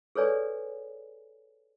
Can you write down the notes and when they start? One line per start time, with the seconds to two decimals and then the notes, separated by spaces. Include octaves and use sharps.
0.15 G#4 A4 B4 C#5 D5 G#5